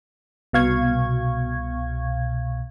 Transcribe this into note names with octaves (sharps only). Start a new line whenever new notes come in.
C2 B2 F5 C#6 G#6